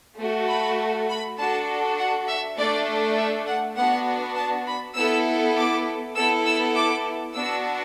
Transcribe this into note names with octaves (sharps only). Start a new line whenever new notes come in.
A3 F#4 A4
B5
B5
D4 F#4 A4 A5
F#5
E5
A3 D4 A4 D5
E5
F#5
B3 D4 F#4 F#5
A5
B5
B3 E4 A4 E6
D6
B3 E4 A4 E6
E6
D6
B3 D4 F#4 E6